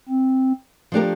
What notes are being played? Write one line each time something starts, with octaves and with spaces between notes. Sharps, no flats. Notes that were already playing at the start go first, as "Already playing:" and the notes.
C4
F3 A3 D4 G4 A#4